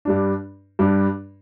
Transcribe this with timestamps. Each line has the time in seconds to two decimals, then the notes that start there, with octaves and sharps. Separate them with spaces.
0.05 G2 G3 D4
0.79 G2 G3 D4